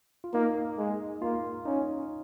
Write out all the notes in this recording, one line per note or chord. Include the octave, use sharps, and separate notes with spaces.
F4
A#3 D#4
G#3
A#3 F4
C#4 D#4